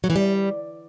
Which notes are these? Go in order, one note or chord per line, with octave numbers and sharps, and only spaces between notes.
F#3
E3
G3